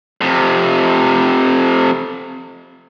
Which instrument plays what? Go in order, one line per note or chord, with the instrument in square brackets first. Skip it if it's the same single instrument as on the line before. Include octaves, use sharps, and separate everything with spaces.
[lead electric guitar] F2 C3